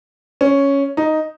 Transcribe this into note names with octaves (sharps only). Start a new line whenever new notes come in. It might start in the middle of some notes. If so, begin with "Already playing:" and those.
C#4
D#4